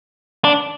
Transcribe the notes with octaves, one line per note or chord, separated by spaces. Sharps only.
D4